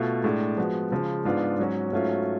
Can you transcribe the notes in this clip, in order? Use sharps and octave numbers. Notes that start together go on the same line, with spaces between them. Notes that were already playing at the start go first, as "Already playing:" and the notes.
Already playing: B2 A3 F4
A2 G#3 D4
F3 G#3 B3 F#4
C#3 F3 G#3
G#2 G#3 B3 D4 F4
G#2 F#3 C#4 F#4
G#2 F#3 A3 C#4 F4